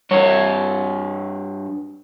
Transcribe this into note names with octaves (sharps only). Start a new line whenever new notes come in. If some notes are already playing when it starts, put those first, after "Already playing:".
G2 C#5